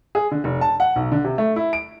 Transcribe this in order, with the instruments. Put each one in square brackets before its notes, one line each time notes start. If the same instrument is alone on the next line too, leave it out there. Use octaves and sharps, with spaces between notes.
[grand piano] G#4
D3
F1
A5
F#5
B1
D3
C3
A3
E4
D7